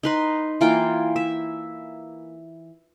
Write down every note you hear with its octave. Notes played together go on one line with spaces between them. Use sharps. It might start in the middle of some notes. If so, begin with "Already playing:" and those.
D#4 B4 C6
E3 A#3 F4 G5
E5